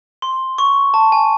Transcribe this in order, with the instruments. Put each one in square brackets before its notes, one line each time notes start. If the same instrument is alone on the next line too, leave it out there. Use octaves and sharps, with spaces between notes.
[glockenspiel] C6
C#6
A5
G#5